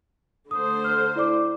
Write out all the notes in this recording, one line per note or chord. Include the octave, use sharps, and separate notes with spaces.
D3 A3 C5 D#6
F6
E4 D5 D6